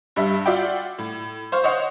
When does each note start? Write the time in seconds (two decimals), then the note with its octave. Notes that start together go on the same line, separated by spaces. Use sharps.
0.16 G2 G3 E5
0.46 F4 F#4 D5 E5 G5
0.98 A2
1.52 C5 F5 C#6
1.63 C5 C#5 D#5 F#5